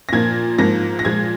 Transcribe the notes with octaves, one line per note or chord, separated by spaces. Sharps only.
A#6
A#2 F3 A#3 G#6
G#2 F3 A#3 A#6
A#6
A#2 F3 G#3 G#6